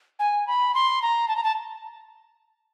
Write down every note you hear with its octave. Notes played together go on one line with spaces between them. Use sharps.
G#5
B5
C6
A#5
A5
A#5
A5